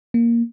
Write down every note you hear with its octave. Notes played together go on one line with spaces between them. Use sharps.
A#3